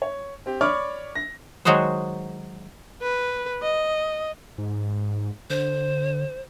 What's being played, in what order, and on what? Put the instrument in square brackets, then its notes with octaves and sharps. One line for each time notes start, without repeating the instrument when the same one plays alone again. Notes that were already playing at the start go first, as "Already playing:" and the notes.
[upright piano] C#5
C4 G4
C#5 D5 B5 C#6 D6 F6
A#6
[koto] D#3 F#3 G#3 F#4 G#4 C5
[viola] B4
D#5
[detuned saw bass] G#2
[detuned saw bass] D3 [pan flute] C5